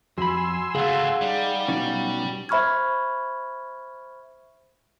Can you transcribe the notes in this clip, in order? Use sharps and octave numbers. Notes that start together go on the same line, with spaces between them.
F2 F#4 G#5 B5 C6 E6
C#2 A3 G#4 F5 F#5
G3 D#4 D5
B2 F#3 C#4 D#4
C5 E5 B5 C#6 F6 G#6